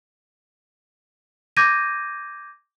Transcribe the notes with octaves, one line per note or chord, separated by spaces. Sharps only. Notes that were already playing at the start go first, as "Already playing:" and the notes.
D6 G6 G#6 A#6 D#7